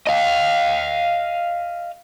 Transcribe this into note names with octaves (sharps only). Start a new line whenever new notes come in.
D#5 F5